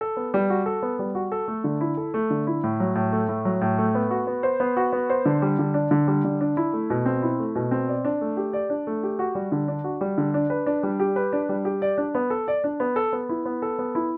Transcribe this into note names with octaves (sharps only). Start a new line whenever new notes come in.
A4
B3
G3
F#4
A4
B3
G3
F#4
A4
A3
D3
E4
A4
A3
D3
E4
A2
F#3
A2
A3
A2
F#3
A2
A3
B3
F#4
B3
C5
B3
F#4
B3
C5
D3
G3
D3
D4
D3
G3
D3
D4
E4
A3
B2
C4
E4
A3
B2
C4
D5
D4
A3
G4
D5
D4
A3
G4
F#4
G3
D3
D4
F#4
G3
D3
D4
B4
D4
G3
G4
B4
D4
G3
G4
D5
D4
B3
A4
D5
D4
B3
A4
B3
E4
B3
A4
B3
E4